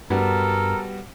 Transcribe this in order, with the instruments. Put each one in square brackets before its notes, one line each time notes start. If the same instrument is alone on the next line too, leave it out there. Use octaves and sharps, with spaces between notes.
[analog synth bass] G2 [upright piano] G3 B3 F#4 [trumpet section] A4 A#4